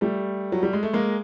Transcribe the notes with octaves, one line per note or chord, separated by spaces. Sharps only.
G3 A3
F#3
G3
G#3
A3
G#3 A#3